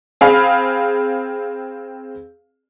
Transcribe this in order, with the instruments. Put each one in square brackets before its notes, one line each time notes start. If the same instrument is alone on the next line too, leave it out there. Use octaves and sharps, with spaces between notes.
[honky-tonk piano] C4 G#4 F5 B5